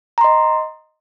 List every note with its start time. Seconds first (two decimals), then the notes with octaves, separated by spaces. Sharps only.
0.18 A#5
0.21 C6
0.24 D#5